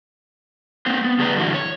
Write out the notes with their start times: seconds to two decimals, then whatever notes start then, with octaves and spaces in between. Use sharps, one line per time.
0.86 A#3 C4 C5
1.04 B3
1.19 A2 C#3 G#4 B4 D5 A#5
1.36 F#2 A#2 D3 E3 E4 F#4
1.54 C#5